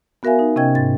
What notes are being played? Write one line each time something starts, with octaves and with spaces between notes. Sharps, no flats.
B3 F#4 A#4 E5 F5 G#5
D#4
C3 C#4 D#5 G5 G#6
G#2 A6